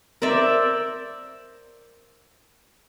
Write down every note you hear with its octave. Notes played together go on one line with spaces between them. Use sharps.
A#4 C5 D5 E5